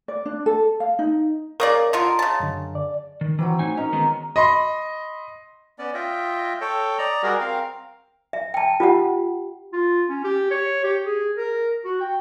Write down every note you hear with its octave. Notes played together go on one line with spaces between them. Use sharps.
D5
D4
A4
F5
D#4
C#3 A#3 A#4 D5 D#5
D3 F4 A#4 D#5 A#5 C6
C#3 A5
F#2 D3
D5
D#3
E3 F#3 C4 B5
A2 D#4 G#5
C#4 D#4 A#4
D#3 G#3 B3
D#5 B5 C6
B3 C#4 D5
F4 D#5 E5 G5
A4 C#5 G5
D5 D#5 A#5
G3 F#4 G#4 A#4
C4 A#4 F5
E5
G5 A5
F4 G4 F#5
F4
C#4
G4
C#5
G4
G#4
A#4
F#4
G5